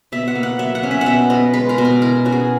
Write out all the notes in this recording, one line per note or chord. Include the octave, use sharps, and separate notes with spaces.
B2 E5
F#5
A#3
F#5
F#3 E5
F#5
C#4
E5
F#5
B2 E5
B3 D#5
G#3 B4
A#4
B2
A#4
E3 A#4
C#4 F#4
G#4